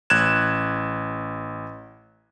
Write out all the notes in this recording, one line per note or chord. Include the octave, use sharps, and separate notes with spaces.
A1 F#6 G#6 E7